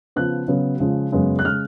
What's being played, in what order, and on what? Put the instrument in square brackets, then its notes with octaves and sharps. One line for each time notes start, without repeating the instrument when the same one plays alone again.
[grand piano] C#3 F3 B3 F#6
C#3 F#3 B3
C#3 F3 G#3
F#2 C#3 G#3 B3
F#6
C#3 G#3 F6